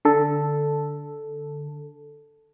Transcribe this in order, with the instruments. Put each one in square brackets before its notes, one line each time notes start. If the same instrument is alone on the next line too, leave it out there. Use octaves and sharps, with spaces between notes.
[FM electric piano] D3 A4